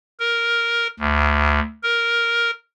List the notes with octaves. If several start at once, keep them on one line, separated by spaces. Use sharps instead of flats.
A#4
D2
A#4